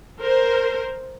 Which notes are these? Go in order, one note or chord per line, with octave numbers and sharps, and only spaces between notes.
A#4 C5